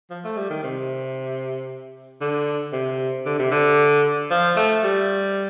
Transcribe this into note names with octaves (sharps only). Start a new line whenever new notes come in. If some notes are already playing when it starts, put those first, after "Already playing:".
F3
A3
G3
D#3
C3
D3
C3
D3
C3
D3
F3
A3
G3